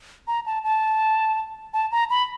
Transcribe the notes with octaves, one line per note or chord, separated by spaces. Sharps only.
A#5
A5
A5
A5
A#5
B5